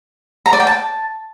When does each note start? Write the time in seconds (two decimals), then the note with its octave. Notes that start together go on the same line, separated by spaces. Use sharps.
0.46 A#5
0.53 D5
0.60 G5
0.67 A5